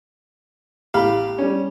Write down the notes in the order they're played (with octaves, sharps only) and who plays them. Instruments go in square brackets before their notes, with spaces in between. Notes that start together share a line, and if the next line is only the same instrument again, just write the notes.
[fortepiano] A1 F5 B5 [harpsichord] G4
[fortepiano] G3 C#4